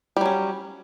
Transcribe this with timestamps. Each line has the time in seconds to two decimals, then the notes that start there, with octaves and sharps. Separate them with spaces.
0.17 G3
0.21 F#3
0.26 C#4